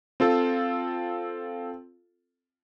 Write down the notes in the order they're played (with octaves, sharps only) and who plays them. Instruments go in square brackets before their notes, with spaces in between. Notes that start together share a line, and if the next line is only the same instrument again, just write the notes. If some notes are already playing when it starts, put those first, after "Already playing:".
[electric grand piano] C4 F4 A4